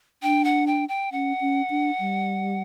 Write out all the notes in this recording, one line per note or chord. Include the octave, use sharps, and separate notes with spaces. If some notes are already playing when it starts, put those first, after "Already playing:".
D4 G5
F#5
G5
G5
C#4 F#5
C#4
D4
G3